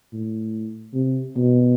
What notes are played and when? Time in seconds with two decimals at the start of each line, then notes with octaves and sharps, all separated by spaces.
0.13 A2
0.94 C3
1.36 B2